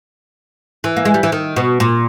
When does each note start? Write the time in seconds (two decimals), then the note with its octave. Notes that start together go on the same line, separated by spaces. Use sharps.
0.84 E3
0.97 A#3
1.05 G#3
1.14 G3
1.23 E3
1.32 D#3
1.56 B2
1.80 A#2